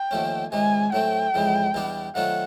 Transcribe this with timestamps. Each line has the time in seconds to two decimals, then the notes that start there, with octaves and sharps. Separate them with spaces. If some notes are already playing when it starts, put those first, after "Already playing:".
Already playing: G5
0.11 D#2 D3 F3 A3 C#4
0.52 C#2 C3 D#3 G#3 G#5
0.92 A2 F#3 A3 C4 G5
1.34 F2 C#3 E3 G#3
1.74 E2 B2 G3 B3 D4
2.15 D#3 F#3 A3 C4 F4 F#5